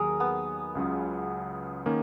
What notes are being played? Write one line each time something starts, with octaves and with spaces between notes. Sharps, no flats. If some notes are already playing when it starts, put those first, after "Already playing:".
Already playing: D#2 D#3 F#3 A#3 D#4 G#4 A#4
B3
C#2 C#3 F#3 C#4 F4
D#3 A#3 C#4